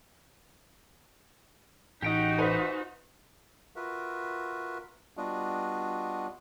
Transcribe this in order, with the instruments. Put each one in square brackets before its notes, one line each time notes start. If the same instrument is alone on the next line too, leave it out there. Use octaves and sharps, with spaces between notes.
[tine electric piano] A1 D#5 [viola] D#4 F#4 [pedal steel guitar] G4 G5 D#6
[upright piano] B4 C5 [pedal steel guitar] E5 G#5
[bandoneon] F4 F#4 A#4 B4 E5
G3 B3 D4 F4 F#4 D#5